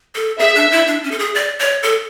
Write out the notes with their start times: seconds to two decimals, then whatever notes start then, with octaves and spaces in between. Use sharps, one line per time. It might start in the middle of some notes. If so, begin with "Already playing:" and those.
0.15 A4
0.39 G#4 E5
0.56 D4
0.72 E4
0.87 D4
1.03 C#4
1.11 A4
1.19 G#4
1.35 D5
1.59 C#5
1.83 A4